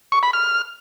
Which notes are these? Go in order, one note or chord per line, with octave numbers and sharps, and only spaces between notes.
C#6
B5
F6